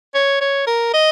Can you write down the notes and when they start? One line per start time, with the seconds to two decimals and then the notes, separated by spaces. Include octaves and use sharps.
0.14 C#5
0.41 C#5
0.67 A#4
0.94 D#5